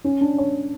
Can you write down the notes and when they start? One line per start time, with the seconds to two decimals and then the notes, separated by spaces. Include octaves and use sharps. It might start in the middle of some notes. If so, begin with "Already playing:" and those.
0.04 C#4
0.21 D4
0.38 C#5